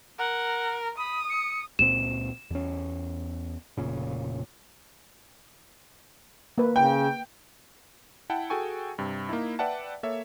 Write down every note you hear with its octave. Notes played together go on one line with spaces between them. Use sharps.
A#4 F#5
B5 D#6
C#7
C#2 A#2 C4 E7
E2 C#4
F1 A#2 C#3
A#3 B4
C#3 G5
E4 F#5 G5 A5
F#4 G#4 A4 G5 G#5 C#6
G2 C3
A#3 D#4 E4
B4 D5 E5 F#5 G5 A5
A#3 A4 C#5 E5